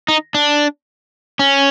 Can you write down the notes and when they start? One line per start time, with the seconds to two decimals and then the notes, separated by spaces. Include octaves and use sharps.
0.08 D#4
0.34 D4
1.39 C#4